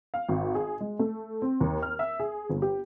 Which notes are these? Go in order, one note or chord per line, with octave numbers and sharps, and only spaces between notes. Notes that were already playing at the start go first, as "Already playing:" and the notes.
F5
G#1
G#4
G#3
A3
C4
D#2
F6
E5
G#4
G1
G4